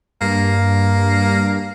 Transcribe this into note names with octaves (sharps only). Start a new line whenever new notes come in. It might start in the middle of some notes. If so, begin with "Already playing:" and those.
G2 A#3